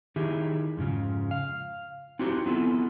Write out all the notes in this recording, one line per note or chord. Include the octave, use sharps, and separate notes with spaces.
D#3 D#4 E4 G4 G#4
F2 G#2 C#3 F3
F5
C4 D#4 E4 F#4 G4 C5
B3 C4 E4 F4 A4